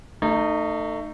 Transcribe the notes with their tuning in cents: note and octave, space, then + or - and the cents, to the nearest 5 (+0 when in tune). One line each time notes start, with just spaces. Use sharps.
A3 +25 D#4 -20